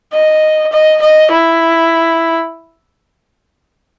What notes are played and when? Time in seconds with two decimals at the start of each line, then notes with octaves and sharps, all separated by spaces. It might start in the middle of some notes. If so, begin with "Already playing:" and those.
0.13 D#5
0.73 D#5
1.02 D#5
1.31 E4